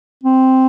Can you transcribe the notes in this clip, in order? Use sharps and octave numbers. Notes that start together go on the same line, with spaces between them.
C4